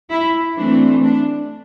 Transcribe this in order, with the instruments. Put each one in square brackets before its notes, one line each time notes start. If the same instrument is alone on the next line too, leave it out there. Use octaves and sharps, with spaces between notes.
[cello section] E4
E3 A3 C4 D4
D4